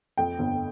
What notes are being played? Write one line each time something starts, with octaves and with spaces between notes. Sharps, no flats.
F2 G5
G1